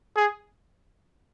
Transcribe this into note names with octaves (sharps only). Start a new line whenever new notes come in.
G#4